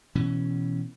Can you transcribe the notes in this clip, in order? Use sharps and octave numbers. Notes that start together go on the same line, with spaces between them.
B2 E3 C#4